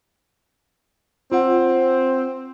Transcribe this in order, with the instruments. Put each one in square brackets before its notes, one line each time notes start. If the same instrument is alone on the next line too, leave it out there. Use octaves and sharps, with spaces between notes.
[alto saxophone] C4 [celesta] F4 F#5